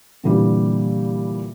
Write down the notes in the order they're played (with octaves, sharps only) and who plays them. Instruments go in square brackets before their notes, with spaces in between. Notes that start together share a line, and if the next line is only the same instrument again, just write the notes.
[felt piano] A#2 D3 E3 G3 G4